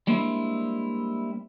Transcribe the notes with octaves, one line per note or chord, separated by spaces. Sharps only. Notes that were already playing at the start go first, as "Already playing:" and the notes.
G3 G#3 A#3 C4 D4 E4